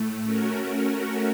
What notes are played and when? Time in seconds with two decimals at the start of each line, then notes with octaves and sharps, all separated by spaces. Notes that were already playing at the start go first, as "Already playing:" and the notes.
Already playing: A2 A3
0.24 A3 C#4 F#4 A#4